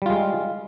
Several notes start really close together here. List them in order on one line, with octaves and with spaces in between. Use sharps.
G3 F4 G#3